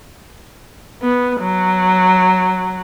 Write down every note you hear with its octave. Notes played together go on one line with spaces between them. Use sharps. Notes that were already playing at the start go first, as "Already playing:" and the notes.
B3
F#3